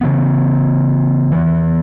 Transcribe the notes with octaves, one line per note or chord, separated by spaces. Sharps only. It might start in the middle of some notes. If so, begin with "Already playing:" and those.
C#3 E3 B3
E3 B3